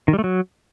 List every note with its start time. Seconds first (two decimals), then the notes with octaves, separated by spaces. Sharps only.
0.08 D#3
0.13 G3
0.19 A3
0.24 F#3